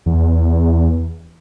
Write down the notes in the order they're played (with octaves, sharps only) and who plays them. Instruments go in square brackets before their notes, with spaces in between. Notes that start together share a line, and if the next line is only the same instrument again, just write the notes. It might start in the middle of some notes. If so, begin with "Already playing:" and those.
[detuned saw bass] E2